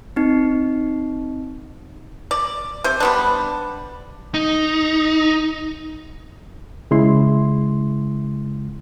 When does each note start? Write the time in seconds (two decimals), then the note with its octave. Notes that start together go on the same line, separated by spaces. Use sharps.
0.16 C4 D#4
2.31 D5
2.84 C3 C5
3.00 G3 B3 D4
4.34 D#4
6.91 C#3 G#3 E4 C6